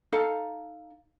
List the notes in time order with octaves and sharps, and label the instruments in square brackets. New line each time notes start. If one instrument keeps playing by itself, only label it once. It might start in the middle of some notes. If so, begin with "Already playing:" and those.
[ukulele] D#4 A4 F5